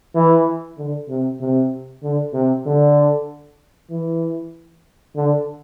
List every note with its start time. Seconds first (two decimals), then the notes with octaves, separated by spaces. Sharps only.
0.15 E3
0.78 D3
1.09 C3
1.40 C3
2.03 D3
2.33 C3
2.66 D3
3.90 E3
5.16 D3